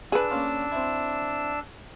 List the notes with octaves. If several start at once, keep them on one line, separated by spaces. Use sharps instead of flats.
D4 G#4 B4 E6
A#3 C#4 F4
C4 E4